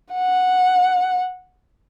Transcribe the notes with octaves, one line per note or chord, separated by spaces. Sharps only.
F#5